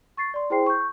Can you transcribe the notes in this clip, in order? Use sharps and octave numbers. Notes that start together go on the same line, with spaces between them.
C#6 A6 C7
D5 C6
E4 G#4 C5 G5 C6 C7
C#6 G6